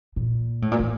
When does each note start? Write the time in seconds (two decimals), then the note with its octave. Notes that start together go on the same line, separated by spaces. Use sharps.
0.16 A#2
0.62 A2
0.72 A#2
0.80 A2